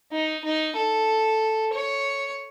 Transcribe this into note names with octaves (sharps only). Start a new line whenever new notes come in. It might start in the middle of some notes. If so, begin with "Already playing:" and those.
D#4
D#4
A4
C#5